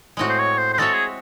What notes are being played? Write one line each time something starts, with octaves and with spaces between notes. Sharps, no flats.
A2 G#3 C4 F#4
C5
C#5
C5
C5
G#3 C4 F#4 A4 C#5 E5
G#4